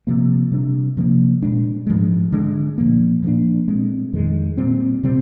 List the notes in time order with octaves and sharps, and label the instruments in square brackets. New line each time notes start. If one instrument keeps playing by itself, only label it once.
[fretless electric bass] C3 F3 A#3
C3 G3 D4
C3 F3 A#3
A#2 G#3 D4
G#2 F3 G#3
D3 G#3 D4
A#2 F3 A#3
A#2 F3 A#3 D4
A#2 G#3 C4
F2 D#3 G#3
A#2 G3 C4
C3 G3 C4